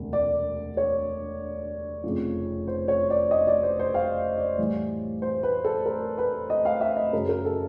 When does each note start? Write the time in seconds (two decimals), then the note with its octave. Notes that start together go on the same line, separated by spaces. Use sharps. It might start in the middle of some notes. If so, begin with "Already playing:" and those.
Already playing: E1 D2 C3
0.13 D5
0.77 C#5
2.04 F1 F2 C#3 F3
2.68 C5
2.88 C#5
3.10 D5
3.31 D#5
3.47 D5
3.63 C5
3.79 C5
3.94 F5
4.38 D5
4.58 A2 E3 G3
5.22 C5
5.43 B4
5.65 A4
5.86 A#4
6.18 B4
6.50 D#5
6.65 F5
6.81 E5
6.97 D#5
7.12 F#2 C#3 F#3 A#4
7.29 A#4
7.45 A4